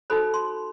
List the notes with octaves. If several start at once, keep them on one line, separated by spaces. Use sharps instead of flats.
D#4 F#4 A4 C5 B5
C6